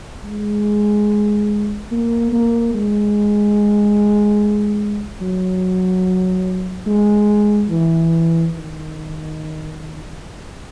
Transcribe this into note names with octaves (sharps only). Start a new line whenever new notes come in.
G#3
A#3
A#3
G#3
F#3
G#3
E3
D#3